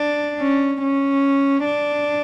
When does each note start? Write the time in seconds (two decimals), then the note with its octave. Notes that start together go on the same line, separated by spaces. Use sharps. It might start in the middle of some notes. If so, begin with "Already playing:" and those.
Already playing: D4
0.41 C#4
0.82 C#4
1.65 D4